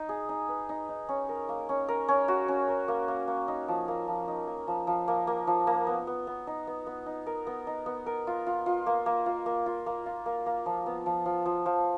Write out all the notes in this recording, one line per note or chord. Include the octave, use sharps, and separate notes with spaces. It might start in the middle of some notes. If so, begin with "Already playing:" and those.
Already playing: D#4
G#4
D#4
B4
D#4
D#4
C#4
A#4
A#3
C#4
A#4
C#4
F#4
C#4
A#4
A#3
A#3
A#3
D#4
F3
A#3
F3
D#4
A#3
F3
F3
A#3
A#3
F3
A#3
B3
B3
B3
D#4
B3
B3
D#4
A#4
B3
D#4
B3
A#4
F4
F4
F4
A#3
A#3
F4
A#3
F4
A#3
F4
A#3
A#3
F3
B3
F3
F3
F3
F3